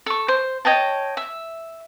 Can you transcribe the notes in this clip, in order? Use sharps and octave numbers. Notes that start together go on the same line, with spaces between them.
A4 C#6
C5
C#5 D#5 G5 A5
E5